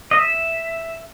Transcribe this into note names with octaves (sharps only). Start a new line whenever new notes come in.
D#5
E5